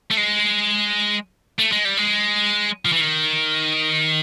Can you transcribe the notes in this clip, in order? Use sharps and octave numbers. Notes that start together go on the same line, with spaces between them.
A3
G#3
A3
G#3
G3
G#3
F3
E3
D#3